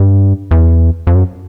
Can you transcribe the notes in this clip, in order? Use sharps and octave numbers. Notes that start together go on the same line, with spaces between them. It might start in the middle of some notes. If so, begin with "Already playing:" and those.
Already playing: G2
E2
F2
F#2